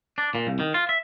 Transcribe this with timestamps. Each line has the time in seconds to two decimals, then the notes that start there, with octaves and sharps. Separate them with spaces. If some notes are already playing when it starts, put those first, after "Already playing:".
0.18 D4
0.35 A#2
0.47 C2
0.60 D#3
0.74 F4
0.89 E5